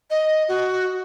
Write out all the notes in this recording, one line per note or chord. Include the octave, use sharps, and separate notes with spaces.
D#5
F#4